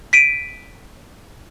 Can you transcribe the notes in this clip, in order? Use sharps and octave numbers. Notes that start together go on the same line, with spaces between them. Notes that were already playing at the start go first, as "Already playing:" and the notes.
B6 D7 D#7